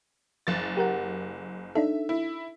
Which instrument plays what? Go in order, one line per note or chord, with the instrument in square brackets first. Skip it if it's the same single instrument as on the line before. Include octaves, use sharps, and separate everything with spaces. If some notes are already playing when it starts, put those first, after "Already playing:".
[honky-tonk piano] F#1 A6
[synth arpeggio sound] G4 A#4 F#5
[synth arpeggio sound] D4 D#4 A4 [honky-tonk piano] E5
[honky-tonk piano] E4